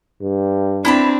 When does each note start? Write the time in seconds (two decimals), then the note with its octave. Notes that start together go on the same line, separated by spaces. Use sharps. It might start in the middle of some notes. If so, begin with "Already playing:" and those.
0.21 G2
0.85 C4 D4 E4 A5 B5